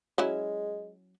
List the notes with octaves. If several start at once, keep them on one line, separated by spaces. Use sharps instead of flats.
F#3 G#3 C#4 E4